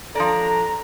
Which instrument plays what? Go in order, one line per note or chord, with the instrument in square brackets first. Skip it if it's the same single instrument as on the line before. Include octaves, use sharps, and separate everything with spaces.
[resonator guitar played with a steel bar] F3 D4 D5 [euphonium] A4 [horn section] A#5